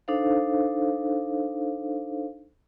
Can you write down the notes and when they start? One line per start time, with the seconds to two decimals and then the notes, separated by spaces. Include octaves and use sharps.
0.08 D4 D#4 A4 C5 F5